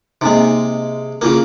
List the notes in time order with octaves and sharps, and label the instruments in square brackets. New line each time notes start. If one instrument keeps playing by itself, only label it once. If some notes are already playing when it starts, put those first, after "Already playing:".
[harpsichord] C3 G#3 [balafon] A#3 C4 D#4
[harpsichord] C#3 A#3 [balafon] E4 F4 A#4